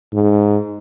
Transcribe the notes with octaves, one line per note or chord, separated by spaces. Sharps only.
G#2